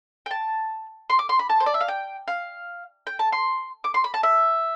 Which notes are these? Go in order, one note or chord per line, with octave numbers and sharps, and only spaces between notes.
G5
A5
C6
D6
C6
B5
A5
C5
D5
E5
F5
G5
F5
G5
A5
C6
D6
C6
B5
A5
E5